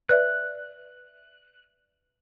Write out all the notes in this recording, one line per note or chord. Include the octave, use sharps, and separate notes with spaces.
B4 D5 E5 F#6